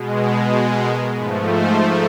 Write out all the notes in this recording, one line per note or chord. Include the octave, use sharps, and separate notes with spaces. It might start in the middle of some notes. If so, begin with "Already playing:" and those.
Already playing: B2 G#3
F#4
G#4
A#4
G#2 F3 A3 B4
C5